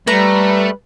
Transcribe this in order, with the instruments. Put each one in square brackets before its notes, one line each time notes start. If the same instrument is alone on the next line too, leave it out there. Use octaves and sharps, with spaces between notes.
[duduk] G3 [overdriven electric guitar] A3 [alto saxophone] B4 [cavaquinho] A#5